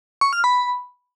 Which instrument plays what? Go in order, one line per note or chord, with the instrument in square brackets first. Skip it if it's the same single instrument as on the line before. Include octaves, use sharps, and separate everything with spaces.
[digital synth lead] C#6
F6
B5